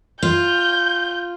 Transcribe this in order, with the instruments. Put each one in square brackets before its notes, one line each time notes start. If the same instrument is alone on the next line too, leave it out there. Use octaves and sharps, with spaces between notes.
[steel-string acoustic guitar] F4 [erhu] G6